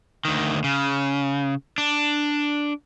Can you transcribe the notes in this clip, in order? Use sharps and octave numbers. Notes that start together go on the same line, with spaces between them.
D2 D#3
C#3
D4